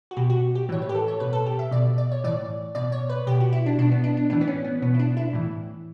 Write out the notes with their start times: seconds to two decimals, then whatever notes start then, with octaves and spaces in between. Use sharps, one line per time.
0.11 F#4
0.17 B2 G4
0.30 F#4
0.55 G4
0.69 A2 E3 C#5
0.82 B4
0.89 G4
0.95 A4
1.08 C#5
1.20 B2 B4
1.33 A4
1.46 G4
1.59 E5
1.71 B2 D5
1.98 D5
2.12 C#5
2.24 A2 E3 D5
2.75 B2 D5
2.92 C#5
3.10 B4
3.27 B2 G4
3.40 F#4
3.53 E4
3.66 D4
3.79 B2 D4
3.91 B3
4.04 D4
4.17 D4
4.30 A2 E3 D4
4.41 B3
4.47 C#4
4.65 B3
4.82 B2 B3
4.94 E4
4.99 D4
5.17 E4
5.33 A2 E3